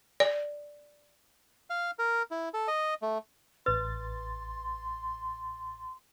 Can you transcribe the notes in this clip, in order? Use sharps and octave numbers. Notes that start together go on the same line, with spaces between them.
D5
F5
A#4
E4
A4
D#5
A3
A1 B4 C6 A6